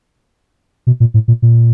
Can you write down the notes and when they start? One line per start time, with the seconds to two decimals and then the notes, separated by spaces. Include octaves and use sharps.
0.87 B2
1.00 A#2
1.14 A2
1.28 A#2
1.42 A#2